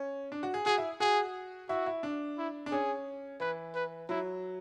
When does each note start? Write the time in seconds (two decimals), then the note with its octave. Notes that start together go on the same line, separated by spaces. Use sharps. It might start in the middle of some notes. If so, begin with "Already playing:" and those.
Already playing: C#4
0.32 D4
0.43 F#4
0.54 G#4
0.66 F#4 G#4
0.78 E4
1.00 F#4 G#4
1.69 E4 F#4
1.86 E4
2.03 D4
2.38 E4
2.66 D4
2.72 C#4 G#4
3.40 E3 B4
3.75 B4
4.09 F#3 E4